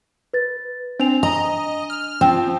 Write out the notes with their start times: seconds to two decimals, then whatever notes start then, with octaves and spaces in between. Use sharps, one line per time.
0.34 B4 A6
1.00 C4 D4 G#5 F7
1.23 D#5 A#5
1.90 F6
2.21 F3 C4